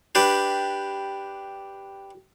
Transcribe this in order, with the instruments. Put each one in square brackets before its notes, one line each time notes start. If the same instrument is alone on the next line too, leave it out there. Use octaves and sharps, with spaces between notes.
[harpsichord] D4 G4 B4